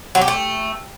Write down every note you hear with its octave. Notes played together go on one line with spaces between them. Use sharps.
F#3
G4
A3